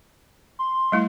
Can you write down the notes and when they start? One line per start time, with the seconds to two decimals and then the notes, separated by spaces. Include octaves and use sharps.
0.59 C6
0.92 G3 A3 E4